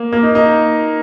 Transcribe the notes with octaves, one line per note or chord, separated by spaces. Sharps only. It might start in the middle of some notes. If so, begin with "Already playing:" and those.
Already playing: A#3
A#3
D#4
D#4